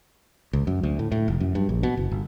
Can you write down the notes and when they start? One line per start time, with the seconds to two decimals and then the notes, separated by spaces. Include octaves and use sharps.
0.53 C#2
0.67 F#2
0.83 D2
0.99 A2
1.12 A2
1.28 F1
1.40 F#2
1.55 G2
1.69 A#1
1.83 B2
1.97 F#1
2.11 G1